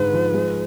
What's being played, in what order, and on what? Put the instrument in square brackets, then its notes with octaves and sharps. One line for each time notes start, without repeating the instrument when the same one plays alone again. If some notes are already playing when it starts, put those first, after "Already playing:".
Already playing: [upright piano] G#1 G#2 D3 G#3 [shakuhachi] B4
[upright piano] F3
G#3